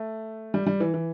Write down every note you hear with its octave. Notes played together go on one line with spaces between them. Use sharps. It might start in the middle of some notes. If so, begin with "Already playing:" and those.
Already playing: A3
G3
G3
E3
E3